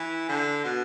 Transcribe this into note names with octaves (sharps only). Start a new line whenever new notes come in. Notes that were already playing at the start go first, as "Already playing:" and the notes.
Already playing: E3
D3
B2